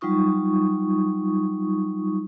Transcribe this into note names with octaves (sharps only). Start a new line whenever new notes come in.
F#3 G3 D#4 F4 C#6 D#6